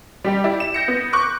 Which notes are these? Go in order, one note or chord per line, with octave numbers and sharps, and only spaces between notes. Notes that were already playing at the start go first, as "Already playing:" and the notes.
G3 G4 D5
E4 G4 D5
E7
G6 A#6 C#7
B3
C#6 D6 F#6 G6